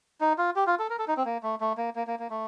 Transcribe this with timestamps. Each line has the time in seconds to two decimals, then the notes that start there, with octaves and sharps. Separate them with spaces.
0.21 D#4
0.38 F4
0.56 G4
0.67 F4
0.79 A4
0.90 A#4
0.99 A4
1.08 D#4
1.17 C4
1.25 A#3
1.43 A3
1.61 A3
1.77 A#3
1.96 A#3
2.07 A#3
2.19 A#3
2.30 A3